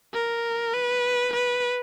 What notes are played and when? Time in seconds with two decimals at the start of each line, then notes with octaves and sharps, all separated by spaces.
0.14 A#4
0.74 B4
1.33 B4